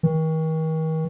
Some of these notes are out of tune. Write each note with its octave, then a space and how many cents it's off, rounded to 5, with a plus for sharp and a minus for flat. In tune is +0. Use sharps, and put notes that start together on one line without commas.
D#3 +40